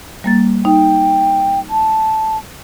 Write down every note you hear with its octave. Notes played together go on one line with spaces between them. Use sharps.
G3 A#3 A6
D#4 G5
A5